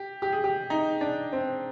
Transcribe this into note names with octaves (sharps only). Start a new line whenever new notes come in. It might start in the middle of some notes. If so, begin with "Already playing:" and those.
Already playing: G4
G4
G#4
G4
D#4
D4
C4